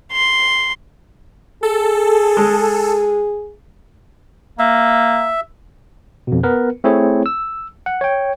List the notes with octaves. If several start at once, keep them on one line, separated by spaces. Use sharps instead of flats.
C6
G#4 A4
G#3
A#3 E5
F2 B2
B3 A#4 B4
A3 C4 E4 G#4 C#5
E6
F#5
C#5 G5